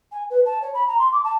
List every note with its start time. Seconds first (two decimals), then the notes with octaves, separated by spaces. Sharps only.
0.12 G#5
0.30 B4
0.45 A5
0.62 C#5
0.74 B5
0.87 A#5
0.99 C6
1.12 D6
1.24 A5